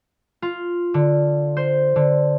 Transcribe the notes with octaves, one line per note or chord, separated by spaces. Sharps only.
F4
D3
C5
D3